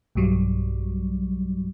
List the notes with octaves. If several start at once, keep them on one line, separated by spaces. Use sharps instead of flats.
B1 G2 F#3 G3